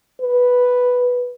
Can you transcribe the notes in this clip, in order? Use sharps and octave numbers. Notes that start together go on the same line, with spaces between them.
B4